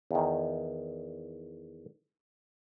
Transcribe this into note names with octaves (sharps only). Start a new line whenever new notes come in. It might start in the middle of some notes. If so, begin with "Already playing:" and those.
E2 D#3